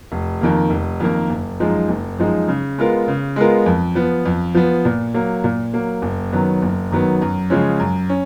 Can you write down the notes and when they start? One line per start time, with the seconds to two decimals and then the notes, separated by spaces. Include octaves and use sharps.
0.12 F1
0.41 F2 D#3 A#3
0.70 F1
1.00 F2 D#3 A#3
1.29 F#1
1.60 F#2 F3 G#3 D#4
1.88 F#1
2.18 F#2 F3 G#3 D#4
2.48 C#3
2.78 G#3 B3 F4 A#4
3.08 C#3
3.36 G#3 B3 F4 A#4
3.66 F2
3.95 F3 B3
4.26 F2
4.55 F3 B3
4.85 A#2
5.14 F#3 A#3
5.44 A#2
5.74 F#3 A#3
6.02 F#1
6.32 F#2 D#3 F#3 B3
6.62 F#1
6.91 F#2 D#3 F#3 B3
7.22 F#2
7.50 C#3 F3 G#3 C#4
7.80 F#2
8.10 C#4